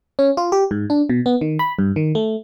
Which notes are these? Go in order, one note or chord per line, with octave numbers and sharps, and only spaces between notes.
C#4
F4
G4
G#2
D4
B2
B3
D#3
B5
G2
D#3
A3